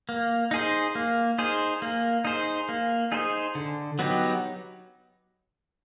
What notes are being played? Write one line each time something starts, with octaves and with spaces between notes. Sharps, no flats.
A#3
D#4 G#4 C5
A#3
D#4 G#4 C5
A#3
D#4 G#4 C5
A#3
D#4 G#4 C5
D3
F#3 B3 D#4 G4